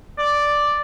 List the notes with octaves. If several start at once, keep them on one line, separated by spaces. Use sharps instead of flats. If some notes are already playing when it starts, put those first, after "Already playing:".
D5